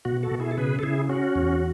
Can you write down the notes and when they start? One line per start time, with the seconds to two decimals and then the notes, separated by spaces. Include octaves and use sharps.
0.05 B2 F#4
0.23 F#4 A4
0.31 B2
0.40 E4 G#4
0.51 A4
0.57 C#3 G#4 B4
0.79 A4
0.83 C#3 E4 G#4
1.09 C#4 F#4
1.36 E2